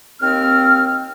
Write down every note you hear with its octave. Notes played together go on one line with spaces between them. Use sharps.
D#2 C4 F6